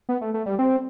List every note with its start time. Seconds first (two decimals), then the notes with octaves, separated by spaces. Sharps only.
0.09 B3
0.21 A3
0.34 A3
0.46 G3
0.59 C4